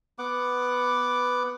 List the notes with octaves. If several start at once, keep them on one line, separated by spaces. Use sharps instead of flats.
B3 F#5 D6